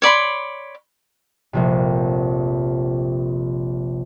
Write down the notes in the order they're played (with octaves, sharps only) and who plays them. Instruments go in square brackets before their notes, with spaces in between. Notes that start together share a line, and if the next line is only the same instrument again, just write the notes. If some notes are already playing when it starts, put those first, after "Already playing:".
[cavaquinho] C#5 D5 B5 C6
[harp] F1 A#1 C3